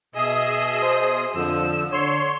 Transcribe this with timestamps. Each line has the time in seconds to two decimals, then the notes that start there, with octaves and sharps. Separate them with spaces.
0.15 B2 G#4 D#5 E5 D#6
0.82 C5
1.35 F2 D3 F3 E6
1.92 D3 C#5 C6